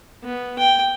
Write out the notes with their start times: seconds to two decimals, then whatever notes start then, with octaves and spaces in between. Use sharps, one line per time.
0.24 B3
0.59 G5